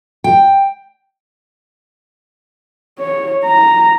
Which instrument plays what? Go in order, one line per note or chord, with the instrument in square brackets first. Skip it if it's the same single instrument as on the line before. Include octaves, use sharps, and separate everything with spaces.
[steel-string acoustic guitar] G5
[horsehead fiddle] C#5
A#5